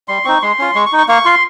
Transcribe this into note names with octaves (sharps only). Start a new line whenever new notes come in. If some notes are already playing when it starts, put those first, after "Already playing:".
G3 C6
C4 D#4 C#6
G#3 C6
C#4 F4
G#3 C#6
C#6
D#4
C#6
A#3 C#6
F4 C6